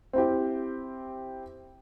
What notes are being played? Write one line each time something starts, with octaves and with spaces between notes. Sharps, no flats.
C4 E4 G4